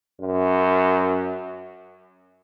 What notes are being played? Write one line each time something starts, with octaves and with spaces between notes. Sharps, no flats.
F#2